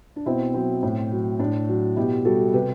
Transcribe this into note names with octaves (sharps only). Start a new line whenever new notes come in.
D4
B2 C4 E4
F#3 C4
A2
F#3
A2 D4
F#3
B2 E4 G4
G3 F#4 A4
C3 G4 B4